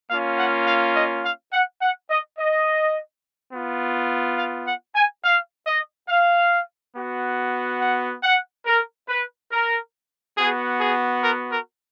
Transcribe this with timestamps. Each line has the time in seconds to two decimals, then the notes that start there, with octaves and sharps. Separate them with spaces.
0.10 A#3 C#4 F4 F5
0.39 F#5
0.67 F5
0.96 D#5
1.25 F5
1.53 F#5
1.82 F#5
2.10 D#5
2.39 D#5
3.53 B3 F4
4.39 F5
4.67 F#5
4.96 G#5
5.25 F5
5.67 D#5
6.09 F5
6.96 B3 F#4
7.81 F#5
8.24 F#5
8.66 A#4
9.09 B4
9.52 A#4
10.38 B3 F#4 G#4
10.81 G#4
11.24 A#4
11.52 A#4